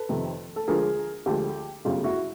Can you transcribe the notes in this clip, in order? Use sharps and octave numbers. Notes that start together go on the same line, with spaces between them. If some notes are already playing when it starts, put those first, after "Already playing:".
Already playing: A4 B4
F2 C3 D#3
A4
D2 D3 F3 G#3 G#4 A#4
D2 D3 F3 G#3 G4 A4
G1 F#2 C#3 F#3 A3 F4 G4
E4 F#4